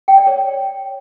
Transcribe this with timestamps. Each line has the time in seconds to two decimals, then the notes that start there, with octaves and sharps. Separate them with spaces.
0.08 G5
0.17 D5
0.27 C#5